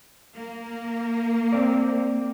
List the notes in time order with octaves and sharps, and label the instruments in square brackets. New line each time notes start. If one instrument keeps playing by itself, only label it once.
[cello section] A#3
[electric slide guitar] C4 D5